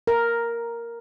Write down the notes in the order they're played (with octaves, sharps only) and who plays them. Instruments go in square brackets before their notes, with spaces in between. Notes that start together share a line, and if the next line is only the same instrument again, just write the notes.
[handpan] A#4